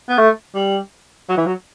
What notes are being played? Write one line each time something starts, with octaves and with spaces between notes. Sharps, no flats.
B3
A3
G3
F#3
E3
F#3